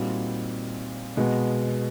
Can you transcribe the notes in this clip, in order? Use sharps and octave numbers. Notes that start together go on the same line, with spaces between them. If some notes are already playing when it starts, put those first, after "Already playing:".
Already playing: A#2 G3 C4 D#4 F#4
B2 G#3 B3